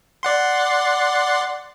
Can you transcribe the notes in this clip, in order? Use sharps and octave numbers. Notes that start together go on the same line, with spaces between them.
D5 F#5 C6